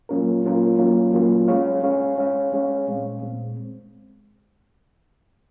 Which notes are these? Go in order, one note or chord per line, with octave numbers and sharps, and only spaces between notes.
F#3 A#3 C#4 F4 A#4
F#3 A#3 C#4 F4 A#4
F#3 A#3 C#4 F4 A#4
F#3 A#3 C#4 F4 A#4
G#3 C#4 G#4 C#5 F5
G#3 C#4 G#4 C#5 F5
G#3 C#4 G#4 C#5 F5
G#3 C#4 G#4 C#5 F5
A#2 G#3 C4
A#2 G#3 C4